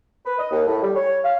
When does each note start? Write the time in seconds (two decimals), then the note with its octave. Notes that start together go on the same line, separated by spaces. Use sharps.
0.24 B4
0.38 D#5
0.51 D#2
0.67 A2
0.82 G3
0.95 C#5
1.24 F5